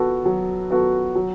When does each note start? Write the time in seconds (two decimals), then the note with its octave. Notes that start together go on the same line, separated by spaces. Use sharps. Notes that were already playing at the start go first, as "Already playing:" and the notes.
Already playing: B3 F#4 A4
0.25 F#3
0.71 B3 F#4 A4
1.15 F#3